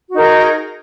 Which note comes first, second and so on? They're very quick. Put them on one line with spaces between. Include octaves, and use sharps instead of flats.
F#4 D#4 A#4 G#4